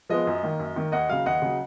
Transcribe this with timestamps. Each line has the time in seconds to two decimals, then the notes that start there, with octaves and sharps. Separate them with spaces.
0.10 F3 G#3 B3 D#5
0.27 F#2
0.43 D#3 A#3
0.59 F#2
0.76 D#3 A#3
0.92 D#2 D#5 F#5
1.09 C#3 F#3 F5
1.26 D#2 D#5 F#5
1.42 C#3 F#3